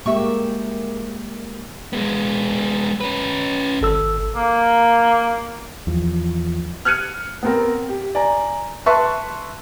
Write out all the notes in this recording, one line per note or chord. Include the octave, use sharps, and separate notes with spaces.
G#3 A#3 G4 E5 C#6
G#3 B3
C#4 B4
G#1 A4 E6
A#3
E2 F3
F6 F#6 G#6 C#7 D#7
B3 C4 A#4
G4
D5 G#5 A#5
B4 E5 A5 C6 C#6 F#6